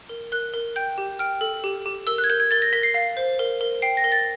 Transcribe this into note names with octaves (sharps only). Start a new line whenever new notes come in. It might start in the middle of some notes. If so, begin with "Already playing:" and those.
A#4
A#4 F#6
A#4
G5 G6
G4
G5 F6
A4
G4
G4
A#4 E6
F#6
G#6
A#4 G6
G#6
A#4 A6
A#6
A#4 B6
C7
F5 C7
C5
A#4
A#4
G5 C7
A#6
A#4
A6